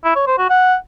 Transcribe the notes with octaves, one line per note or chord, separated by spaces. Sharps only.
E4
C#5
C5
F#4
F#5